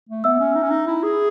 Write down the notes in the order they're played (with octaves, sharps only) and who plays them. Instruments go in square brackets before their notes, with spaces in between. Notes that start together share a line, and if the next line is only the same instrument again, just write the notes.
[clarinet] A3
[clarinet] B3 [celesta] E5 E6
[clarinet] C#4
D#4
C#4
D#4
E4
G#4